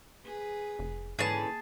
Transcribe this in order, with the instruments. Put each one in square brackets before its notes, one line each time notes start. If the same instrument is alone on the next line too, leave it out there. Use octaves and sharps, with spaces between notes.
[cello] G#4 B4
[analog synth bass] F1
[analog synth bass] G#2 [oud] D3 E3 C#4 [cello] A#3 [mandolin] G#4 A5